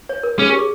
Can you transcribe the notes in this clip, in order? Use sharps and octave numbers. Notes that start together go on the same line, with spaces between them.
C#5
A#4
C#4 G#4
G4
G#4